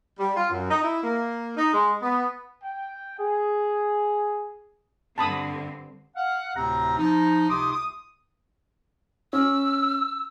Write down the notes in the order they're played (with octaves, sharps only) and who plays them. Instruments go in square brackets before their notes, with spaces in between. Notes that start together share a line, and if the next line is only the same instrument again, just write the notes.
[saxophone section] G3
F4
F#2
D#4
E4
A#3
D#4
G#3
B3
[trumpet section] G5
G#4
[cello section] G2 D3 C4 [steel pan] A5 B5 D#6
[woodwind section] F5 F#5
D2 A2 C3 C4 A#5
F3 D#4
C#2 C3 D#4 C6 D6 D#6
D#6
[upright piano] C#4 [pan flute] E6